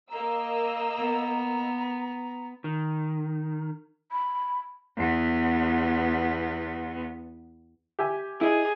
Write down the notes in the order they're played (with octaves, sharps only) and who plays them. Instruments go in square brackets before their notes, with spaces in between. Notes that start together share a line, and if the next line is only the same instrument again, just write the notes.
[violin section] A#3 D#5 E6 [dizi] A#5
[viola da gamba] B3
[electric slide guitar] D#3
[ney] B5
[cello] E2 B3
[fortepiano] G4 E5 G#5
[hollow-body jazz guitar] E4 D#5 [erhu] G#4